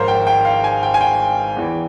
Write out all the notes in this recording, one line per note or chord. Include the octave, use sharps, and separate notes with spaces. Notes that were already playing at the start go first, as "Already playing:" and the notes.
Already playing: G#1 G#2 F3 A#4 C5 C#5 F5
G5
G5
F5
G#5
G5
G#5
G5
E2 E3